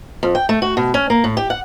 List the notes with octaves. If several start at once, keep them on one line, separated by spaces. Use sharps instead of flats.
F2
G5
A3
F#4
B2
C#4
A#3
A2
G4
F#5